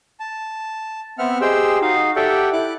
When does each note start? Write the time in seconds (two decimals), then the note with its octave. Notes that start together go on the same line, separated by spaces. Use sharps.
0.20 A5
1.18 B3 C4 E5 F#5 F6
1.41 G4 G#4 C5 D#5 G5 E6
1.82 D#4 F#4 D#5 F5
2.16 G4 A4 D5 E5 F#5 G5
2.53 E4 D6 F#6